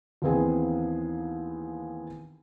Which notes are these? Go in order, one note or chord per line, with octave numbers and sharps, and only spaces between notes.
D#2 E3 B3 C4 G#4 G#5